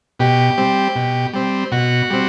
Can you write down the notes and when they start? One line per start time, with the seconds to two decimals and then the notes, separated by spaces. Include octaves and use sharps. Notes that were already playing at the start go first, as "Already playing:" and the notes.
0.19 B2 G4
0.58 G3 C4
0.96 B2
1.33 G3 C4
1.72 B2 F#4
2.10 G3 C4